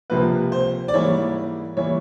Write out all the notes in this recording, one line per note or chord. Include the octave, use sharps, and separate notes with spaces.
C#2 C3 F3 A#3 B4
C5
D5
G#2 E3 G3 A#3 C#5
E3 G3 A#3 C#5